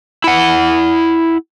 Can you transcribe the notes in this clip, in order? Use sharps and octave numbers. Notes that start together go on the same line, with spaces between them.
E4 F#5